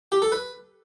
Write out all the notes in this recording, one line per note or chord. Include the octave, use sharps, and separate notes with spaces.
G4
A4
B4